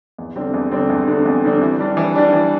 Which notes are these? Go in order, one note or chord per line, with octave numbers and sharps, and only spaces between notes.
E2
D3 G3 C4
E2
D3 G3 C4
E2
D3 G3 C4
E2
D3 G3 C4
E3
G3 D4
E3
G3 D4
E3